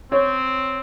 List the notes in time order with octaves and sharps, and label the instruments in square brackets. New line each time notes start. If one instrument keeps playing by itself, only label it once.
[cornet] C4 [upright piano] C#5